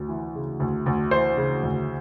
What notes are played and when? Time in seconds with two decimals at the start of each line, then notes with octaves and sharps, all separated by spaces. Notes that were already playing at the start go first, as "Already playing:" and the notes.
Already playing: D2
0.09 E3
0.35 C#3
0.60 D2
0.86 D2
1.11 E3 C5
1.37 C#3
1.63 D2